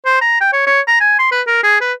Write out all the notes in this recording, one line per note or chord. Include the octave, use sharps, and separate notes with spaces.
C5
A#5
G5
C#5
C#5
A#5
G#5
C6
B4
A#4
G#4
B4